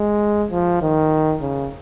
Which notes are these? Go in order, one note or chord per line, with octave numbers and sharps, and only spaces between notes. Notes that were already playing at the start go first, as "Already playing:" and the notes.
Already playing: G#3
F3
D#3
C#3